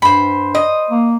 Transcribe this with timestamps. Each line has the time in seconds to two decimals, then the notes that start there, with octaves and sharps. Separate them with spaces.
0.02 G2 C5 B5
0.55 D#5
0.90 A#3